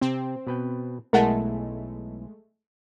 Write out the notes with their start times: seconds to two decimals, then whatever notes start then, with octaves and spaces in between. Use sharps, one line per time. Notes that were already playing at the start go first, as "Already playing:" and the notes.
0.01 C3 C4
0.47 B2 B4 G5
1.13 B1 G#3 A3 E4 A#4 F#5 A5